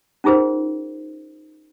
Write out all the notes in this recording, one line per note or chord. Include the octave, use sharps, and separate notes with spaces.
C#4 D#4 F4 G#4 A#4 C5